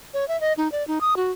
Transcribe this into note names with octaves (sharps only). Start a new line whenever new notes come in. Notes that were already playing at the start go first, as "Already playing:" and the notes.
C#5
E5
D#5
D#4
D5
D#4
D#6
F#4